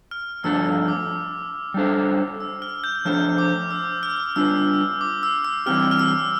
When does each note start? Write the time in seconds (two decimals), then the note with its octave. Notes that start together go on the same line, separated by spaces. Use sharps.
0.11 F6
0.44 G2 F3 A3 D4 A4 E6
0.66 E6
0.88 D6
1.74 G3 D4 A4 C5
2.40 E6
2.62 F6
2.84 G6
3.05 F3 A3 D4 A4 C5 F6
3.38 D6
3.71 E6
4.03 F6
4.36 G3 D4 F4 B4 E6
5.01 D6
5.23 E6
5.45 E6
5.66 E3 G3 C4 G4 F6
5.91 F6
5.99 E6